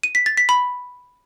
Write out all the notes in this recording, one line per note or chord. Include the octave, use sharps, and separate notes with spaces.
D#7
B6
A6
B6
B5